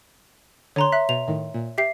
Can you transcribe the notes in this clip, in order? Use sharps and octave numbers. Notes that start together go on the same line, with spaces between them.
D3 C#5 A#5 C6
E5 F#6
B2 F7
A2 D#3
A#2
G4 E5 C7